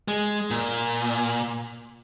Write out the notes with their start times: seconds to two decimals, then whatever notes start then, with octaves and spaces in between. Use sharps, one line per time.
0.08 G#3
0.51 A#2